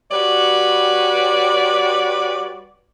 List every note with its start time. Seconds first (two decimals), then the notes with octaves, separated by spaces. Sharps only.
0.11 G3 F#4 B4 C#5 D5